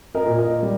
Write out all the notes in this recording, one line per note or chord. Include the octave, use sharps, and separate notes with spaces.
A#4 D#5
A#2
A#4 D#5
G3